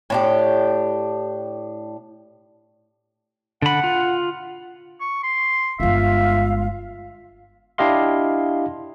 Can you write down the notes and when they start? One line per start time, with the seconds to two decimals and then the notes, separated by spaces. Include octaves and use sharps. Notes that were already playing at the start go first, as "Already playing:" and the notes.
0.10 A2 D4 G4
3.62 D3 F#5 B5
3.84 F4
5.01 C#6
5.24 C6
5.80 G1 G#3 F4 E5 F5
7.78 D4 E4 G4 D#5 F5 C6